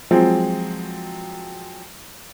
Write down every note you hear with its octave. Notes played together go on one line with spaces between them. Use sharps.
F3 F#3 G#3 C4